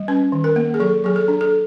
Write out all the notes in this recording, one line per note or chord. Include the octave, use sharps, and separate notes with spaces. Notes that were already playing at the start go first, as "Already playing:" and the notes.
Already playing: G3
C#4 B4
D#3
A#4
A#3
G#4
F#3 A4
F#3 G#4
A4
D4
A4